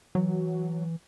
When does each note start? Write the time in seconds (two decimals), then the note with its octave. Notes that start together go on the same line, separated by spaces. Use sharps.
0.15 E3 F#3